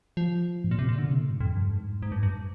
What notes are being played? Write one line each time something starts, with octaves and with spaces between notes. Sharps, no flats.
F3
G#2
A#2
C3
A#2
D3
C3
A#2
G#2
F2
G2
G#2
G#2
G2
G2